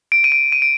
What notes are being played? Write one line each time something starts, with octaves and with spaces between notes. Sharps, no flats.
D7
D#7
D7
D#7
D7